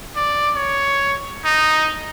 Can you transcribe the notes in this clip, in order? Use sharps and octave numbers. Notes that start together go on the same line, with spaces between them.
D5
C#5
D#4